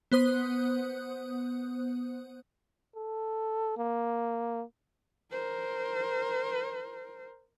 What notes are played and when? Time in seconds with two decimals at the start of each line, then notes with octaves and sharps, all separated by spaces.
0.12 B3 C5 D#6 F#6
2.96 A4
3.77 A#3
5.32 A#4 C5